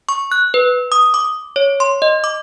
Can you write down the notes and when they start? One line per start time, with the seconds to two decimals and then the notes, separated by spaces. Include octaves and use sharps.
0.09 C#6
0.32 F#6
0.54 B4
0.92 D#6
1.14 D6
1.56 C#5
1.80 C6
2.02 D#5
2.24 D6